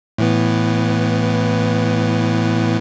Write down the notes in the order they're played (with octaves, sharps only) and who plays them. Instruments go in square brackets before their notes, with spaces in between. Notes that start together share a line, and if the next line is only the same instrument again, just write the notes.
[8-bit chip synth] A2 E3 B3